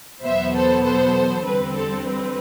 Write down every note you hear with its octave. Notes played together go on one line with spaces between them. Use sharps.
E2 B2 F#3 B3 C5 E5
A4 C5
A4 C5
E2 D3 G3 C4 B4
A4
B4